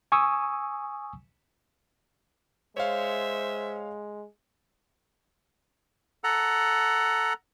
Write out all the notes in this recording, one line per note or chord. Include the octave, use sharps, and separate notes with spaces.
G#5 C#6 D#6 E6
G#3 C5 C#5 E5 F5
A4 F#5 A#5